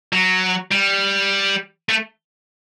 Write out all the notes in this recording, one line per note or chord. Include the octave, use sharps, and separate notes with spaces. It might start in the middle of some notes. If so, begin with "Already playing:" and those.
F#3
G3
A3